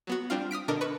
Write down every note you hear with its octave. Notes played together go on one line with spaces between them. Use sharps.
F#3 B3 F#4
G3 C4 D4 F4 F5
D#6 F6 B6 D7
B2 D3 D4 A#4 D#5
B4 C#6